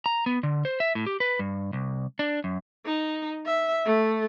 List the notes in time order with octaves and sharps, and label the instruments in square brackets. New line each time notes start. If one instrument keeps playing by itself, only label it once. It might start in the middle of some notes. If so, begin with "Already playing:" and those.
[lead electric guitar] A#5
B3
D3
C5
E5
A2
G4
B4
G2
C2
D4
F#2
[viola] D#4
E5
A3